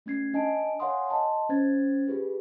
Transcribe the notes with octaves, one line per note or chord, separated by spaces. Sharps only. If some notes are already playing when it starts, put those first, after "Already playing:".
A3 C#4 G#6 C7
D4 D#5 G#5 A5 D7
C#5 F5 F#5 G#5 C6 D#6
D#5 A5 C6
C#4 C5 G#6 A6
F4 G4 G#4 B4